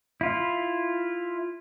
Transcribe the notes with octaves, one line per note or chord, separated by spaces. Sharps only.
E4 F4